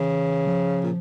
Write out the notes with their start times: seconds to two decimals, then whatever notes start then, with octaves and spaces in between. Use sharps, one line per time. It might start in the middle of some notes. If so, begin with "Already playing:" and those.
Already playing: C#3 E3
0.47 F3
0.83 A#2